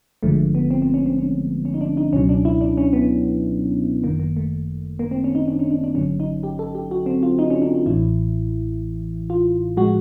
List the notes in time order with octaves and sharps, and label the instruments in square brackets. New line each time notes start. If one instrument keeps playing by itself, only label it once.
[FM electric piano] G#1 G2 D3 F3 G#3 A3
B3
C4
C4
C#4
C4
C#4
C#4
D#4
D4
D#4
C#2 B2 F#3 C#4
D4
E4
D4
C#4
B3
G1 F#2 D#3 A#3
A#3
A3
A#3
C4
C#4
D#4
D4
C#4
D4
D4
G#1 G2 D3 F#3 C#4
D#4
G4
A4
G4
F#4
C4
F4
D#4
C#4
D4
D#4
A1 A2 E3 E4
F4
A2 F3 G#3 F#4